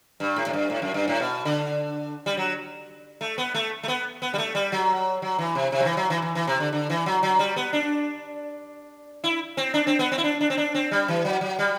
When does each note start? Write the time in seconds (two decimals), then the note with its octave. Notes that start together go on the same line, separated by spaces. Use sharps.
0.20 G2
0.36 A2
0.47 A2
0.53 G2
0.70 A2
0.82 F#2
0.94 G2
1.08 A2
1.20 B2
1.45 D3
2.26 G3
2.37 F#3
3.21 A3
3.38 B3
3.54 A3
3.83 A3
3.88 B3
4.22 B3
4.34 G3
4.38 A3
4.55 G3
4.72 F#3
5.22 F#3
5.39 E3
5.55 C3
5.72 C3
5.80 F#3
5.85 E3
5.97 F#3
6.10 E3
6.22 E3
6.35 E3
6.48 C3
6.60 D3
6.73 D3
6.90 E3
7.06 F#3
7.23 F#3
7.39 G3
7.56 B3
7.73 D4
9.24 E4
9.57 C4
9.74 D4
9.87 C4
9.99 B3
10.12 C4
10.18 E4
10.24 D4
10.41 D4
10.50 C4
10.57 D4
10.75 C4
10.91 G3
11.08 E3
11.25 F#3
11.41 F#3
11.59 G3